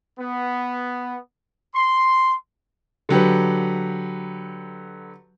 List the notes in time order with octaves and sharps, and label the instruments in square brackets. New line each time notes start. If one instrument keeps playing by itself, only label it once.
[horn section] B3
C6
[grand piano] D3 F#3 G4 B4